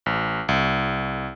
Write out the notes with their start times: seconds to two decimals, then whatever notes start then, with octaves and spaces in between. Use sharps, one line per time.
0.06 A1
0.49 C2